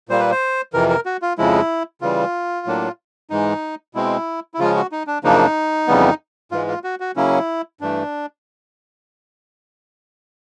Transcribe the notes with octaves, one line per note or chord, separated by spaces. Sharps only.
A#2 G3 A#3 C5
B4
C5
F2 C3 E3 A#4
A#4
F#4
F4
F2 C#3 F3 G#3 E4
C#3 E3 G3 F4
A2 F#3 A#3 D4
G#2 E3 G#3 D#4
B2 G#3 C4 E4
E4
C#3 F3 G#3 C#4 F4
F#4
D#4
D4
F#2 C#3 F3 A#3 D4 D#4
F2 C#3 E3 G3 B3
G#2 E3 G#3 F4
F4
F#4
F#4
C#3 F#3 A#3 C#4 E4
G2 E3 A3 D4